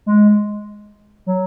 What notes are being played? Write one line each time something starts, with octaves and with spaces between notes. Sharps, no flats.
G#3
F#3